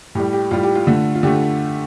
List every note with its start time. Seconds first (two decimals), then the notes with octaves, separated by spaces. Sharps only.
0.15 A2 G3 G4
0.33 G4
0.51 A2 G3 F4
0.63 G4
0.75 F4
0.87 D3 A3
1.15 F4
1.23 D3 A3 G4